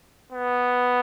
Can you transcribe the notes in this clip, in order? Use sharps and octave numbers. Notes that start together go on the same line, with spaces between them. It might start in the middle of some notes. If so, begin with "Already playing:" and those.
B3